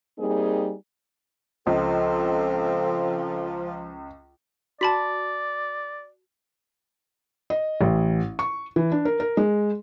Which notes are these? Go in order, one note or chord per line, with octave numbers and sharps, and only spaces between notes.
G3 A#3 C4 D#4 G#4
C#2 F3 C4 A4
F#4 D5 A5 B5 B6
D#5
A1
C#6
E3
D4
A#4
A#4
G#3